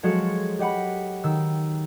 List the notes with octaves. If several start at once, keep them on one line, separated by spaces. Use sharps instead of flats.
F3 F#3 G#3 F#4 A4 C#5
G4 D#5 F#5 B5
D#3 E6